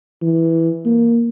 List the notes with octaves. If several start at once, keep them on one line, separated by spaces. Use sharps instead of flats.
E3
A#3